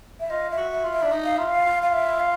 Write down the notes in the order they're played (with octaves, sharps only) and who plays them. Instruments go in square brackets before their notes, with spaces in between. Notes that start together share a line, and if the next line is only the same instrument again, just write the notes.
[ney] E5
[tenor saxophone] F4 [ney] D#5
[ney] E5
[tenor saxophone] F#4
[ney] E5
[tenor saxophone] F4
[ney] E5
[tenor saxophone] D4
D#4
[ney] F5
[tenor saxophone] F4 [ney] E5
[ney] F5
[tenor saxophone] F4
[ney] F5
E5
F5